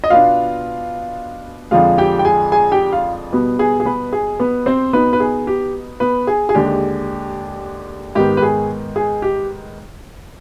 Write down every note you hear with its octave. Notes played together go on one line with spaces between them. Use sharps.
D#5
B2 B3 D4 F4 F5
F2 D3 F3 G#3 F4 F5
G4 G5
G5
G#4 G#5
G#4 G#5
G4 G5
F4 F5
B2 G3 B3
G#4
G#4
B3 B4
G#4
B3 B4
C4 C5
B2 B3 D#4 B4
B4
G#4
G4
B3 B4
G#4
G#4
D#2 D3 G#3 D4 G4
G#2 D#3 B3 G4
B4
G#4
G#4
G4